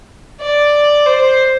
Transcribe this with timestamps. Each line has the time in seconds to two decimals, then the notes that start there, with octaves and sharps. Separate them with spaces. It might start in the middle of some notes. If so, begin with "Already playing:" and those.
0.41 D5
1.06 C5